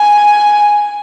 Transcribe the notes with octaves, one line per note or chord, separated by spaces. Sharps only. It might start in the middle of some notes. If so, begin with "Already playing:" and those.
Already playing: G#5